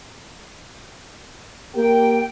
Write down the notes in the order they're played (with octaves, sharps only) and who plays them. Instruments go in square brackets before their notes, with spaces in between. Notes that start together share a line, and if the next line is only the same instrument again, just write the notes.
[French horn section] A#3 G4 A#4 [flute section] G5